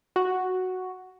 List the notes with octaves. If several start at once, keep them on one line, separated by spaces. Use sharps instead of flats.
F#4